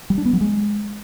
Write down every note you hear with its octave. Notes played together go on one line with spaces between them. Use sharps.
G3
D4
B3
F#3
G#3